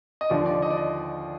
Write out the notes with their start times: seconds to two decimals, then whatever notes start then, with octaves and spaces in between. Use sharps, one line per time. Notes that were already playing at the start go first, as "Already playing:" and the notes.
0.21 D#5
0.30 D#2 D3 F3 D5
0.46 D5
0.62 D#5
0.71 D5
0.78 D#5